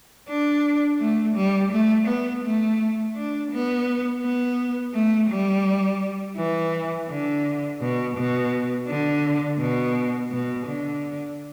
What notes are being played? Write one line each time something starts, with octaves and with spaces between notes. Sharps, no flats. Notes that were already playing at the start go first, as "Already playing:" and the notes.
D4
A3
G3
A3
B3
A3
D4
B3
B3
A3
G3
E3
D3
B2
B2
D3
B2
B2
D3